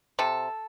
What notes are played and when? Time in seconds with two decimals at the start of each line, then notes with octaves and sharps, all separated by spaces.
0.19 C3 A4